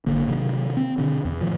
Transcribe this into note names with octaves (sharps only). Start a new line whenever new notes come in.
G#1 D3 A#3
C3 D#3 F#3
C4
B2 D3
E2
A2 D#3 F3